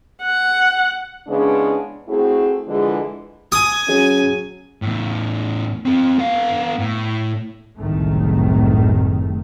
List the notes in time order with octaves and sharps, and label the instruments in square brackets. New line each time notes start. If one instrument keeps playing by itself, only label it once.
[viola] F#5
[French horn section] C#3 E3 G#3 B3 D4
A3 C4 E4 F#4 G#4
D3 E3 F3 G#3
[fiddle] G#5 [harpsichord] D#6
[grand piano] F#3 G#4 [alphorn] C#4
[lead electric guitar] E2 A2
C4 A4
B3 F5
A2
[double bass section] F#1 C2 A2 D#3 A3